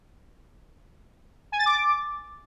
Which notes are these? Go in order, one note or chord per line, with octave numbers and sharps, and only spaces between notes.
G#5
A6
D6